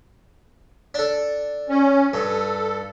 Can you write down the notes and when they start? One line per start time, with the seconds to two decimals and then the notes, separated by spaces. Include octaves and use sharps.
0.94 D4 A4
1.69 C#4
2.14 G2 A4